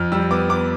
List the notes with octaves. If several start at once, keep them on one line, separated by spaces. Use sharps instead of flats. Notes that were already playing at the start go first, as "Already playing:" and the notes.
Already playing: F2 F6
G3 E6
B3 D6
B3 D6